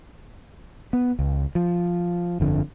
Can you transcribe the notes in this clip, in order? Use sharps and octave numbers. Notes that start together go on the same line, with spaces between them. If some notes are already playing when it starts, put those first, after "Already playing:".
B3
C#2
F3
G1 F2 D3